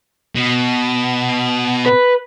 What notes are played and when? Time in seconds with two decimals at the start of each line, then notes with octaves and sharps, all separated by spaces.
0.36 B2
1.86 B4